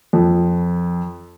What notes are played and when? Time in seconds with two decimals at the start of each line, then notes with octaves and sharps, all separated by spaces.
0.13 F2